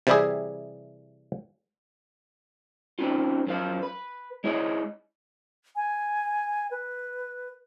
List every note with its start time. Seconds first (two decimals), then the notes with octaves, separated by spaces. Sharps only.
0.07 C3 E3 G3 E4 G4 G#4
2.99 C4 C#4 D#4 F4
3.47 F#2 F3 F5
3.83 B4
4.44 G#3 E4 C#5 D#5
5.76 G#5
6.71 B4